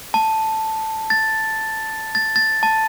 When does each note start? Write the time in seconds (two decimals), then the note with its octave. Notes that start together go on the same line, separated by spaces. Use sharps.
0.14 A5
1.10 A6
2.15 A6
2.36 A6
2.63 A5